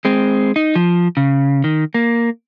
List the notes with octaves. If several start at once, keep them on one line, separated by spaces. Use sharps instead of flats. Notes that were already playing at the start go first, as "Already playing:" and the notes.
G#3 C4
D#4
F3
C#3
D#3
A#3